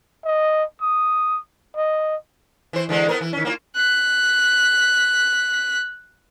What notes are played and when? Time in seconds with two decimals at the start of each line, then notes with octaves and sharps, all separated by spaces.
0.25 D#5
0.82 D#6
1.76 D#5
2.73 E3 C5
2.89 D3 E3 G#3
3.08 B3 C4 A#4
3.21 E3
3.33 D#3 C#4
3.45 A#3 C4 F4
3.76 F#6 B6